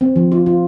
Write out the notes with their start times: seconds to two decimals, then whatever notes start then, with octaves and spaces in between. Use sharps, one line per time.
0.01 C4
0.16 F3
0.32 F4
0.46 F4